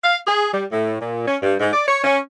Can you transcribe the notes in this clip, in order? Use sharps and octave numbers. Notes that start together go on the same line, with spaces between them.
F5
G#4
G3
A2
A#2
C#4
G2
G#2
D5
C#5
C#4